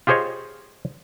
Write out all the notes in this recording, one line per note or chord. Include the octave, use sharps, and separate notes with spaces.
F4 G4 G#4 C5 C#5 D#5